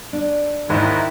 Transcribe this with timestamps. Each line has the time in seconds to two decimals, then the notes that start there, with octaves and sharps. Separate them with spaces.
0.13 D4
0.69 D#2 G#2 D#3 E4